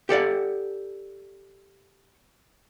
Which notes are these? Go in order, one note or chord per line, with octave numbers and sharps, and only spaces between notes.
G4 A4 D5 F#5